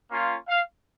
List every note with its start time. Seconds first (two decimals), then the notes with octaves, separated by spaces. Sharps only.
0.09 A#3 C#4 F4
0.47 F5